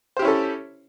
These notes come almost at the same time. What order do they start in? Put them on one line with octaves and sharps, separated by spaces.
C5 G4 E4 C#4 A4